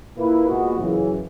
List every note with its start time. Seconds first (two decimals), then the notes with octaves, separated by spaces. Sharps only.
0.16 A#2 A#3 E4 B4
0.47 A#2 G#3 B3 F#4
0.78 F#2 C#3 E3